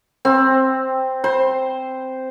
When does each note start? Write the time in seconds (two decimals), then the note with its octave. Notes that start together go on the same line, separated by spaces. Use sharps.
0.25 C4
1.24 C5